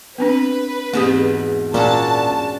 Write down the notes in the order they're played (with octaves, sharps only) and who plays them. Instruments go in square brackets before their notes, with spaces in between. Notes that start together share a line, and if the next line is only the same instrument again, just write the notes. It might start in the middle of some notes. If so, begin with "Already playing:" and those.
[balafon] B3 C4 D4 [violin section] B4
[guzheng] E2 G#2 B2 [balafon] A#3 C4 G4
[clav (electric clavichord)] A#2 [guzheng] C#4 D4 F#4 [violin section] A5